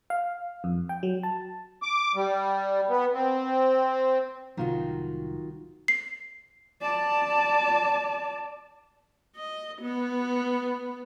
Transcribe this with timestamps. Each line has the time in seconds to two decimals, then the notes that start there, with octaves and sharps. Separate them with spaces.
0.10 F5
0.64 F2
0.89 G5
1.03 F#3
1.23 A5
1.82 D6
2.15 G3
2.89 B3
3.14 C4
4.57 C2 A2 D#3 F#3 F4 F#4
5.88 C7
6.82 D5 A5
9.36 D#5
9.81 B3